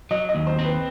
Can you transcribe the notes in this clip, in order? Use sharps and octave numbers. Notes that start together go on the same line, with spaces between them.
F#3 D#5
D#5
D#2
C5
C4
B4